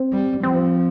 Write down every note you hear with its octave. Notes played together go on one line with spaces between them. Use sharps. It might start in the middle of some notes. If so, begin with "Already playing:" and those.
Already playing: C4
G3
F3 C4